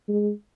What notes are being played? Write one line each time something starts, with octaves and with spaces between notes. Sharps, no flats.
G#3